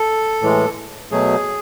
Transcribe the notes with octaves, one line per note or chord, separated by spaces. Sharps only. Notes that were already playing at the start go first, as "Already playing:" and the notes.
Already playing: A4
A2 E3 G#3
B2 F#3 A3 G#4